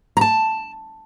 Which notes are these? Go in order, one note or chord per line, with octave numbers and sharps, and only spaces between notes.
A5 A#5